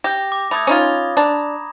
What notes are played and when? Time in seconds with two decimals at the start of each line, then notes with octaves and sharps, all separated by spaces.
0.04 G4 G6 A#6
0.32 D6
0.51 A3 B5 D#6 G#6
0.67 C#4 D#4 F4
1.17 D4 A#5 B5